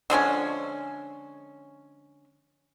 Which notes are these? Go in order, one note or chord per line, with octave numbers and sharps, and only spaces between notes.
D3 F3 G#3 C#4